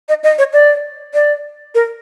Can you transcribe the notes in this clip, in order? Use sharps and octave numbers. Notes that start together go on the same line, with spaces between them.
D#5
D#5
C#5
D5
D5
A#4